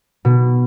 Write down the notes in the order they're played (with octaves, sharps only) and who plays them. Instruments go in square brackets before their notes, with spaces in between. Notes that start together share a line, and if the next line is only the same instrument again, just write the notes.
[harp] B2